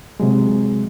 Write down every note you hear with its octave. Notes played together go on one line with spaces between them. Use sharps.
C3 F#3 G#3